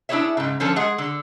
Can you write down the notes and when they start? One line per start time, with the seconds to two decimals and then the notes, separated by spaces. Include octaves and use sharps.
0.09 D4 E4 F4 G#4 C#5 E5
0.37 G#2 C#3
0.60 D3 F3 C#4 F4 A4
0.76 G#3 G#4 F#5
0.98 D3